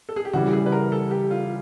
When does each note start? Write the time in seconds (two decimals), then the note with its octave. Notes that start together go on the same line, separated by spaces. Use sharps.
0.09 A4
0.16 G#4
0.25 G4
0.33 C#3 E3 G3 F#4
0.53 G#4
0.66 B4
0.72 A#4
0.92 A4
1.11 G4
1.31 F4